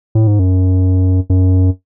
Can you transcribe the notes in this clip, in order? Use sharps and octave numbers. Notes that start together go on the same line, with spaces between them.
A2
G#2
F#2
F#2